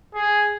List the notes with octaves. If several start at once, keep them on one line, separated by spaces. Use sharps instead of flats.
G#4